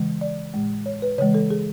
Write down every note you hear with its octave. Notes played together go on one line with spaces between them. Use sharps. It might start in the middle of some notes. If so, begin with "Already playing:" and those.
Already playing: C#3 E3 G#3
D5
A2 G#3
C#5
B4
C#3 E3 G#3 C#5
A4
G#4